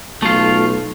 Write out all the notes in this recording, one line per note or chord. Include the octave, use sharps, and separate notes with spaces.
B1 A3 F4